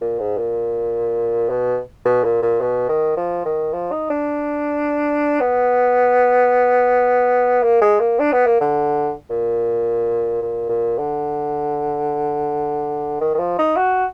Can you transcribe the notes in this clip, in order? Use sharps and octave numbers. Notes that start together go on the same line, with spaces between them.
A#2
G#2
A#2
B2
B2
A#2
A#2
B2
D#3
F3
D#3
F3
D#4
D4
B3
A#3
G#3
A#3
D4
B3
A#3
D3
A#2
A#2
A#2
D3
D#3
D#3
F3
D#4
F#4